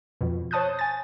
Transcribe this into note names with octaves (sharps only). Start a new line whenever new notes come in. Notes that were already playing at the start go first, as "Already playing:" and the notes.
F2 B2
C5 C#5 A5 D#6 F#6 G6
G#5 A6